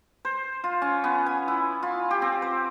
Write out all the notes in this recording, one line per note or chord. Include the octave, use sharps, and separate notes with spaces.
C5
F4
C#4
B3
G#5
E4
F4
G4
C4
C5